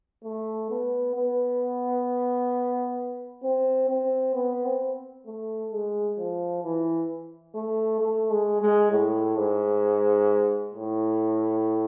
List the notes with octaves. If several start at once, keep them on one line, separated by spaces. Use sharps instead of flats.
A3
B3
B3
C4
C4
B3
C4
A3
G#3
F3
E3
A3
A3
G#3
G#3
A2
G#2
A2